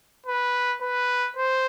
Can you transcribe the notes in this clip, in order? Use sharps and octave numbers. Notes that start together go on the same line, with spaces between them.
B4
B4
C5